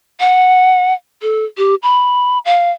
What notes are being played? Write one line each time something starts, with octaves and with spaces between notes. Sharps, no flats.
F#5
A4
G4
B5
F5